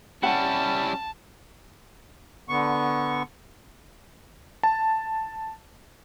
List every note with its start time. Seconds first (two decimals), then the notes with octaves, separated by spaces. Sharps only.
0.23 G3 C#4 E4 F#5 G5 A5
2.49 D3 B3 C#6
4.63 A5